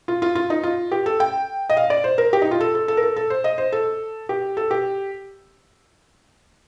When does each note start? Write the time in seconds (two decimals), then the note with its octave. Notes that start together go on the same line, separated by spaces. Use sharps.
0.08 F4
0.22 F4
0.35 F4
0.50 D#4
0.63 F4
0.92 G4
1.06 A4
1.20 G5
1.70 D#5
1.77 F5
1.90 D5
2.04 C5
2.18 A#4
2.33 G4
2.42 D#4
2.51 F4
2.61 A4
2.75 A4
2.88 A4
2.97 A#4
3.03 A4
3.16 A4
3.30 C5
3.44 D#5
3.58 C5
3.73 A4
4.29 G4
4.57 A4
4.71 G4